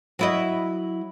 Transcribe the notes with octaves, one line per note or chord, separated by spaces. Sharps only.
F#3 E4 D#5